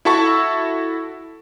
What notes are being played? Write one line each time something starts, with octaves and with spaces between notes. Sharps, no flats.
E4 F#4 A4 E5 A5 C#6